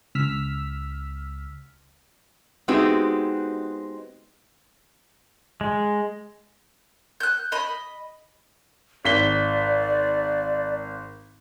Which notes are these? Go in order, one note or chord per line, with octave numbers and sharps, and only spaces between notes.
C#2 E6 F6 B6
G#3 B3 C4 D#4 F#4 G4
G#3
F#6 G6
D#5 B5
G#1 D5 B6 G7